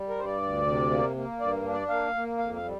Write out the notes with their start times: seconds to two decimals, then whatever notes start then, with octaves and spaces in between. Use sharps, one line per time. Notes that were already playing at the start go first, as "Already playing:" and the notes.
Already playing: G3
0.09 A#4
0.17 G2 C5
0.25 D5
0.42 D2
0.66 C3
0.91 A#3
1.16 A#3
1.40 G2 D5
1.64 D4
1.73 D5
1.89 A#3 F5
2.15 A#3
2.38 F2 F5
2.56 F5
2.64 G3